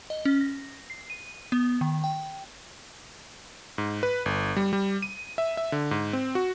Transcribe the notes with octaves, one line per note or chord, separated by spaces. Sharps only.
D#5
C#4
A#6
C7
D#7
B3
D#3
G5
G#2
B4
G1
G3
G3
D#7
E5
E5
D3
G#2
C4
F#4